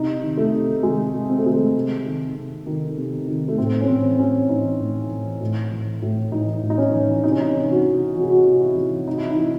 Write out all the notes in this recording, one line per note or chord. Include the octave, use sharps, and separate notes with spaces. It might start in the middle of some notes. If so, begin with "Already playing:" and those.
Already playing: C3 D#4
D#3
A3
C3
D#3 G#3
C3
C4
A3
D#3 G#3
A3
C3
D#3
C3
D#3
C3
D#3
A3
A2 C4
C#4
E3 C4
A2 C#4
E3 D#4
A2
E3
A2
E3
A2
E3 D#4
A2
D#4
C#4
E3
C3 D#4
C#4
D#4
E3
F#4
C3
E3 F#4
G#4
F#4
C3
E4
E3
C3 D#4
E4
D#4
E3